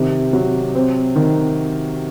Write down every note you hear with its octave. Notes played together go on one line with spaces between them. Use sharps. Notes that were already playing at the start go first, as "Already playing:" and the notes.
Already playing: C3 D#3
F#3
C4
D#3